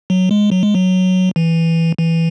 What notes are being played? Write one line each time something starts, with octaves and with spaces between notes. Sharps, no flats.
F#3
G#3
F#3
G#3
F#3
E3
E3